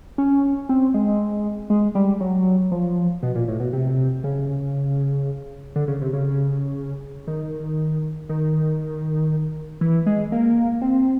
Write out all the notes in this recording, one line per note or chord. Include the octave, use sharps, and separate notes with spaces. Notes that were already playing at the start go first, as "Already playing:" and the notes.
C#4
C4
G#3
G#3
G3
F#3
F3
B2
A#2
A2
B2
C3
C#3
D3
C#3
C3
C#3
D#3
D#3
E3
G#3
A#3
C4